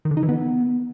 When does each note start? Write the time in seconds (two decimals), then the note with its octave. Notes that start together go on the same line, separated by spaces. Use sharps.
0.05 D#3
0.11 D3
0.17 D#4
0.23 E3
0.29 B3